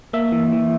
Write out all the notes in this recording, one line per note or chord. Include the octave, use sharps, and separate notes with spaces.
A#3 E5
E3
E3